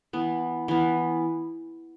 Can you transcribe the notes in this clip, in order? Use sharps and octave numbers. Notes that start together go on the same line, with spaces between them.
E3 B3
E3 B3